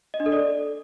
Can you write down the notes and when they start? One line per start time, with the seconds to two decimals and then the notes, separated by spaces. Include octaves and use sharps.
0.14 D#5
0.20 D4
0.26 A4
0.32 D5